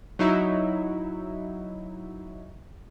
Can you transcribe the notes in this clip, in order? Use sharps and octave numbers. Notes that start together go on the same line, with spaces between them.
F#3 D#4 E4